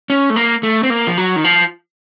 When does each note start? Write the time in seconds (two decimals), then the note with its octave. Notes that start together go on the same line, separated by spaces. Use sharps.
0.10 C#4
0.30 A3
0.36 A#3
0.63 A3
0.83 C4
0.90 A#3
1.07 F3
1.18 F#3
1.36 D#3
1.44 F3